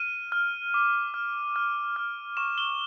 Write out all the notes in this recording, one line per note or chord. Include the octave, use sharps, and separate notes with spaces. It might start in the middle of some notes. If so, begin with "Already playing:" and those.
Already playing: F6 D#7
F6
D6
F6
F6
F6
C#6 E7
G7